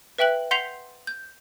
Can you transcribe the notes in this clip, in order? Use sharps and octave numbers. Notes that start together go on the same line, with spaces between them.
B4 E5 G5 F#6 F#7
F#5 C6 G6 B6 C7 F7
G6